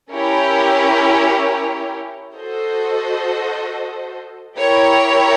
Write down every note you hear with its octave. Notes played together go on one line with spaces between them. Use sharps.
C#4 E4 G4 A#4 C#5
F#4 A4 C5 D#5
E4 G4 A#4 C#5